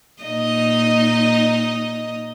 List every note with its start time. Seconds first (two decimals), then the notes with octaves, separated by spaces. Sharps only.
0.23 A#2 D#4 D#5